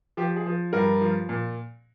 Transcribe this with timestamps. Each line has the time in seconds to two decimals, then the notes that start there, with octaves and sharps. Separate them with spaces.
0.17 F3 G4
0.36 G#4
0.46 F3
0.73 G2 A#4
1.01 F3
1.29 A#2